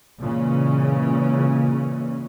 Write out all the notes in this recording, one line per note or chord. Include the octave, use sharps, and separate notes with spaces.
A#2 C#3 E3 G#3 C#4